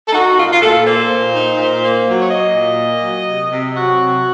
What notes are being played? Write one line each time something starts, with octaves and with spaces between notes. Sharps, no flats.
A4
D#4 F#4
A#2 F4
F4
A#2 A4
A#3 C5
A#2
D#4
A#2
A#3
F#3
C#5
A#3 D#5
A#2
A#3
F#3
C3
C3
F#3 F#4
C3